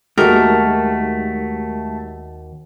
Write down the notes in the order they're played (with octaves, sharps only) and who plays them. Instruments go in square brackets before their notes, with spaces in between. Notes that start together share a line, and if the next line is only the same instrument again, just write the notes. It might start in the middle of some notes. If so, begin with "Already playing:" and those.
[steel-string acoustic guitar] D#2 F#4 [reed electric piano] G#3 D#4 G4 [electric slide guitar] A3 [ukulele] A#4